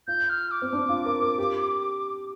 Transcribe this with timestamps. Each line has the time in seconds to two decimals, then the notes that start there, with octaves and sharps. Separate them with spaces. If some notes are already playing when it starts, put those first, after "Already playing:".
0.07 F4 G6
0.30 F6
0.51 D6
0.62 C4
0.73 D4
0.89 F4
1.06 A#4
1.22 A#4
1.38 G4